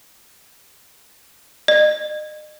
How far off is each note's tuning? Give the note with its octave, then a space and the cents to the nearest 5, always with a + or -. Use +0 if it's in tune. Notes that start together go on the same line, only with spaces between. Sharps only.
D#5 -40